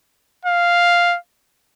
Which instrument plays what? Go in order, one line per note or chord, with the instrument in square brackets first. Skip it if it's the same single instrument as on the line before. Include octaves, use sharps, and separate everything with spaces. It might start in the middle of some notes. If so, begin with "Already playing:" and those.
[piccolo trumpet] F5